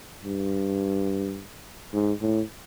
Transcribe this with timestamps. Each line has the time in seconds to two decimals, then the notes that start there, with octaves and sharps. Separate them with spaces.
0.24 G2
1.93 G#2
2.21 A2